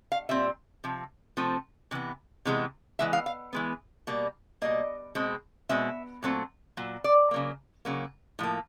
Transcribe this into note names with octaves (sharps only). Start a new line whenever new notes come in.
F5
A#2 G3 C4 E5
C3 F3
C3 F3 A3 C4
C3 E3 B3
C3 E3 G#3 B3
E3 G#3 B3 E5
F5
F5
E3 G#3 B3
B2 G3 A#3
B2 G3 A#3 D#5
B2 G#3 C4
B2 G#3 C4 E5
A#2 F#3 A3 C4
A#2 F#3
D5
C#3 F#3 A#3
C#3 F#3 A#3
A2 F3 A#3